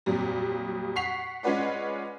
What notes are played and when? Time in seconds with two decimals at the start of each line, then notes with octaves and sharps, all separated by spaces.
0.06 F2 A#2 F#3 G3
0.96 F#5 C#6 B6 C7 F7
1.43 G#3 C#4 F4 B4 D5 F#5